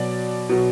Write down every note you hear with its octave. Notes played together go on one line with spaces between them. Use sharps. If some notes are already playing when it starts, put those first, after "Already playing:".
Already playing: B2 F#3 D5
B2 F#3